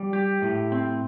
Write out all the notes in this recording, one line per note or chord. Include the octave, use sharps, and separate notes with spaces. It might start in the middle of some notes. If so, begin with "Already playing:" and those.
Already playing: G3
G4
A2
C4